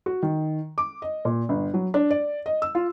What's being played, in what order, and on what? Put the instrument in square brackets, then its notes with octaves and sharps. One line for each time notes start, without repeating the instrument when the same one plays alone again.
[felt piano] F#4
D#3
D6
D#5
A#2
G1
F#3
D4
D5
D#5
E6
F4